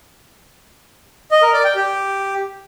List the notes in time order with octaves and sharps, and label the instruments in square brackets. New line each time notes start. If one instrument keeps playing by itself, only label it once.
[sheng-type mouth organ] D#5
A#4
D5
G5
G4